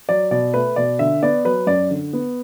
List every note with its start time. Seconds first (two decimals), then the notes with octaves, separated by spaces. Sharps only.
0.09 F#3 D5
0.31 B2 D5
0.54 A3 B4
0.76 B2 D5
0.99 D3 E5
1.23 B3 D5
1.45 F#3 B4
1.67 F#2 D5
1.90 D3
2.13 B3